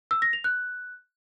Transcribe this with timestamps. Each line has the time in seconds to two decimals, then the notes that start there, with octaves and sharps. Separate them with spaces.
0.11 E6
0.22 A#6
0.33 F7
0.44 F#6